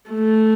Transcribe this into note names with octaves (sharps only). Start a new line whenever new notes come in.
A3